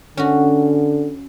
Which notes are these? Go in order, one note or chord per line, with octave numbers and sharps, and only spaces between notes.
D3 C#4 F#4